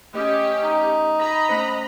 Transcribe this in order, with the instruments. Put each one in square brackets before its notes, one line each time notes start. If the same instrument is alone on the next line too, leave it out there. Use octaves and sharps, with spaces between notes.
[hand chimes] A3 D#5 D#6 [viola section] C#4 G4
[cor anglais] D#4
[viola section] D#5 A#5 B5 [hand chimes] A#6
[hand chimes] A3 C#4 C5